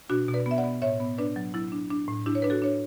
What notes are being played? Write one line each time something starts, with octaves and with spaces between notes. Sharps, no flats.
B2 D4 F#4
B2
B4 D5
B3
E5
D5 F#5
B3
A2 C#5 E5
B3
D4 B4 D5
F#3
F#3 E4
D4
D4
A2
D4 E4 G4
C#5
D4 B4
F#4 A4
D4 C#5